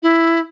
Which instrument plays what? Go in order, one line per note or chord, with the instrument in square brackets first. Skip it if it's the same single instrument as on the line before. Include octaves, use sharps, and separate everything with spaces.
[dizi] E4